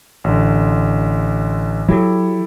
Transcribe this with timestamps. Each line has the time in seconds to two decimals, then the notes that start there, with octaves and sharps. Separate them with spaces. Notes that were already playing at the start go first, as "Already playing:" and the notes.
0.24 A1 D3
1.88 F#3 E4 G4 A4